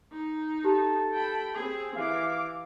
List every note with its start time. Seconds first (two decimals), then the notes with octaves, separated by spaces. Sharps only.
0.12 D#4
0.64 G4 A4
1.13 G5 B5
1.54 C4 G#4
1.96 E3 F5 D6